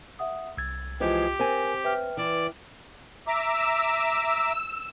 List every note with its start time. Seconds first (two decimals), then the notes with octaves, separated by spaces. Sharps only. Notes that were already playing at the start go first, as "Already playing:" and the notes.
0.19 E5 F#5 D#6
0.57 C2 E6 G#6 A6
1.00 E3 F3 G#3 G4
1.40 C4 A#4 G#5
1.84 B4 E5 G5 F6
2.17 E3 D5
3.27 E5 A#5 D6 E6